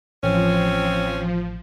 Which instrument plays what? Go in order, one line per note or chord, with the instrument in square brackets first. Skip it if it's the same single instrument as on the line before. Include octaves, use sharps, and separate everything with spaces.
[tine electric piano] A1 [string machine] F3 [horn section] C4 C#4